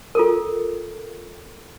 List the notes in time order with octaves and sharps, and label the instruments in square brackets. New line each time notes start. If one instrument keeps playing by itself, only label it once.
[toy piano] F4 A4 A#4